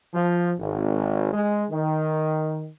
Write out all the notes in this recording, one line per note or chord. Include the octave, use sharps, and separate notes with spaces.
F3
G#1
G#3
D#3